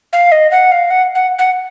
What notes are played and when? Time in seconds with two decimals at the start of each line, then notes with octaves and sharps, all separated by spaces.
0.13 F5
0.32 D#5
0.51 F#5
0.72 F5
0.91 F#5
1.15 F#5
1.39 F#5